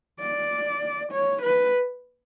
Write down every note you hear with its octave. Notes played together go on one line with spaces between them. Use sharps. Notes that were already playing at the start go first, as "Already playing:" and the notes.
D5
C#5
B4